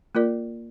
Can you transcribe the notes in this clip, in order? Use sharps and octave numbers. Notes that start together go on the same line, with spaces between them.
A#3 F4 A#4 D5